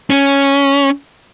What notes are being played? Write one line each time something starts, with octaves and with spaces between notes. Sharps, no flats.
C#4